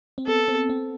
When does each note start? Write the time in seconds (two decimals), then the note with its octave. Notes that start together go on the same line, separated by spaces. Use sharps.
0.18 C4
0.27 B3 A4
0.48 C4
0.69 C4